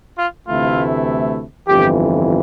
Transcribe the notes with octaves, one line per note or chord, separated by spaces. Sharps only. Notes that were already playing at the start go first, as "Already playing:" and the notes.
F4
D2 C3 E3 A3 E4 F4
G1 F2 E3 G4